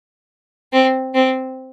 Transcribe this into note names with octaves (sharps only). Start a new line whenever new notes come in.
C4
C4